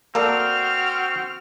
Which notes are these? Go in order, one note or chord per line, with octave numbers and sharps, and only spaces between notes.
A#3 C4 F#4 A4 D5 F6